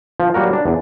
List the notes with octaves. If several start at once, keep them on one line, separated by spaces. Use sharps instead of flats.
F3
F#3 G3 A#3 F#4 A#4
D4
E2